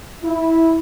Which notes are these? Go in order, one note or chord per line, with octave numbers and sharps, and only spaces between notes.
E4